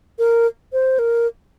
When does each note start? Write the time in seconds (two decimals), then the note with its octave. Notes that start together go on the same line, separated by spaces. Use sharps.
0.19 A#4
0.73 C5
0.99 A#4